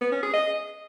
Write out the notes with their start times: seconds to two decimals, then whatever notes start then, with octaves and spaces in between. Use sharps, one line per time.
0.01 B3
0.12 C#4
0.23 G#4
0.33 D#5